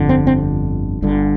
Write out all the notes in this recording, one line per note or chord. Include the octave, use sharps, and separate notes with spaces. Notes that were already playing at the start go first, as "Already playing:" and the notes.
Already playing: G1 F2 D3
C4
C4
G1 G2 D3